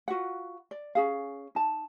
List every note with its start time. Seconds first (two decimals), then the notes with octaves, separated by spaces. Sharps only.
0.08 F4 F#4 B4 F#5
0.71 D5
0.95 C#4 G#4 F5
1.55 D#4 A5